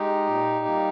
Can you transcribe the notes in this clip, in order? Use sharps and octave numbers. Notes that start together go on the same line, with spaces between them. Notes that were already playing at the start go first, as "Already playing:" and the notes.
Already playing: G#3 D#4 G4
A#2
G3 A#3